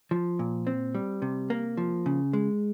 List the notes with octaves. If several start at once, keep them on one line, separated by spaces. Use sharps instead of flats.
F3
A#2
C4
G3
C3
A#3
F3
C#3
G#3